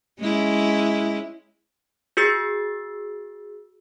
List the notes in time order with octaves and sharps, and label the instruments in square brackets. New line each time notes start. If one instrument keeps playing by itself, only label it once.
[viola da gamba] G#3 C#4 E4
[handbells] F#4 G#4 E6 A6 C7